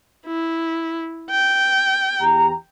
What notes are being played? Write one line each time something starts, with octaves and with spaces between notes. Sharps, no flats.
E4
G5
E2 G4 A#5